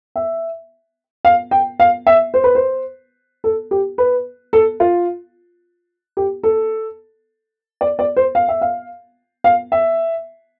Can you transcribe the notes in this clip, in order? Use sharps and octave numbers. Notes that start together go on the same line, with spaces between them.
E5
F5
G5
F5
E5
C5
B4
C5
A4
G4
B4
A4
F4
G4
A4
D5
D5
C5
F5
E5
F5
F5
E5